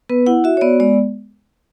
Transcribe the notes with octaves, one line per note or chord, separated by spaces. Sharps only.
B3 B4
E4 F#5
F#4 E5
C#5
B3 D5
G#3 D5